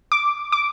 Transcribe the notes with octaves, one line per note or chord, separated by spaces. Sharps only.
D6
D6